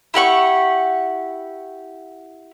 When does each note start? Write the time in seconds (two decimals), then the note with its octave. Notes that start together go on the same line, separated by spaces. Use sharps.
0.14 E4 G4 F#5 C#6